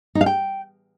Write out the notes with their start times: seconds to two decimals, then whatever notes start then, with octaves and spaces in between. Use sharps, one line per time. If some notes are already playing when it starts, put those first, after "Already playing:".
0.15 D#4
0.21 F5
0.26 G5